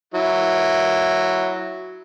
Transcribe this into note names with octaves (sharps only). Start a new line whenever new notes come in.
F#3 E4